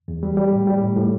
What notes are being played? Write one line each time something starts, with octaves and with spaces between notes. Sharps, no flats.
E2
G3
G3
A2
G3
A2
A2